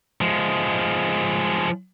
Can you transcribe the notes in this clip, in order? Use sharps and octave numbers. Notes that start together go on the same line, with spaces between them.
F3 G#3